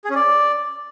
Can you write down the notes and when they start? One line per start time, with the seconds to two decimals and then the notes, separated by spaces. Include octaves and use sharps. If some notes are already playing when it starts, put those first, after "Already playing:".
0.05 G#4
0.10 C#4
0.15 D5